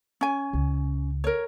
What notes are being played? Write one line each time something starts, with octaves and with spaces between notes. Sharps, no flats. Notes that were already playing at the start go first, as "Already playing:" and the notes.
C#4 G#5
C#2
A#4 C#5